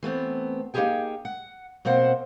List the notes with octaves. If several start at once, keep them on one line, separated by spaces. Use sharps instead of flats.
E3 A3 B3 C4
A#3 D#4 E4 G4 G#4 G5
F#5
B2 A#3 C4 C5 F#5